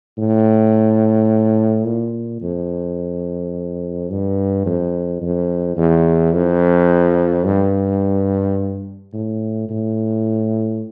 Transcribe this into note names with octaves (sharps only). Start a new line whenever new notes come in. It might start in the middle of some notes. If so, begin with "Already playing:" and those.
A2
A#2
F2
G2
F2
F2
E2
F2
G2
A2
A2